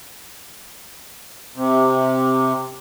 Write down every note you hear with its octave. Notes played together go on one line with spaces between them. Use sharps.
C3